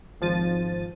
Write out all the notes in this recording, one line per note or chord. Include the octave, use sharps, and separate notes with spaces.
G#1 F3 A6 D#7